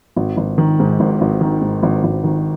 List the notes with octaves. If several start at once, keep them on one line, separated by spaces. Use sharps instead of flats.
G#1
G#1
D#3
G#2
G#1
G#1
D#3
G#2
G#1
G#1
D#3